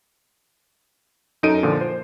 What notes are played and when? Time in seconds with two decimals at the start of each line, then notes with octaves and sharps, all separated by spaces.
1.43 F#2 D#4 A4 D7 D#7
1.63 A#2 D3 F3
1.81 C5